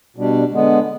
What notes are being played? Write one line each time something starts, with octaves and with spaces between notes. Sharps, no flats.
B2 G3 D4
D3 G#3 B3